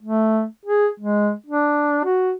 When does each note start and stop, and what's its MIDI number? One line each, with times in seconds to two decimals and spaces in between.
0.02 0.45 57
0.65 0.88 68
1.00 1.32 56
1.46 2.03 62
2.05 2.33 66